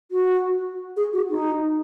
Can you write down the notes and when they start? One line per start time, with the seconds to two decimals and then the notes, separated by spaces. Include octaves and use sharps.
0.11 F#4
0.97 G#4
1.13 F#4
1.30 D#4